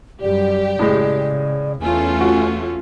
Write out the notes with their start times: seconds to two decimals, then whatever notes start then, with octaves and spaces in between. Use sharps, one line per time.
0.22 F#2 G3 G4 D5
0.79 A2 C#3 G#3
1.81 E2 A3 C#4 F4 G#5
2.21 F#4